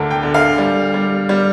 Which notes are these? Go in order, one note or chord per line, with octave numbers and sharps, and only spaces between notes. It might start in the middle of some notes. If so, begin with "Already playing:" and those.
Already playing: D2 D3 A3 A5 A#5
G5
D3
F5
G3
G3
G3